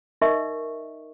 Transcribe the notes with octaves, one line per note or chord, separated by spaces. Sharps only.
D#4 A#4 D#5 E5 C#6